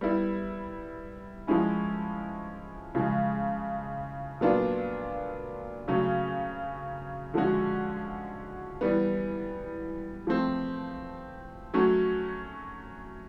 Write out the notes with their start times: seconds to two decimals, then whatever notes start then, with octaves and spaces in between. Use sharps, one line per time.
0.01 G3 B3 E4
1.47 F3 G#3 C#4 E4
2.95 C#3 F3 G#3
4.41 A#2 F#3 B3 D4 F4
5.88 C#3 F#3 A3 C#4
7.34 D3 F3 G#3 C#4 F#4
8.81 E3 G3 B3
10.27 F3 A3 C4
11.74 F#3 A3 C#4 F#4